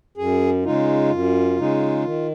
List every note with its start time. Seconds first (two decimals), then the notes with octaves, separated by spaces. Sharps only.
0.17 F#2 G#4
0.64 C#3 G#3 D#4 F4
1.11 F#2
1.57 C#3 G#3 D#4
2.04 D#3